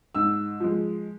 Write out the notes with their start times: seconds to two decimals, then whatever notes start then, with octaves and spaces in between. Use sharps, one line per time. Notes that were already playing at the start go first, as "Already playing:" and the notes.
0.15 G#2 E6
0.60 F3 G#3